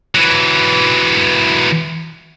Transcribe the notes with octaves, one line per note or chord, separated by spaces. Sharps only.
E3 F#3